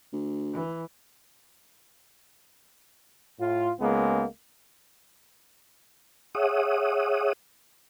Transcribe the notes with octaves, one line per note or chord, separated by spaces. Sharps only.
D2
E3
A2 F4
C#2 G#3 A#3 B3
G#4 C#5 E5 F#5 D#6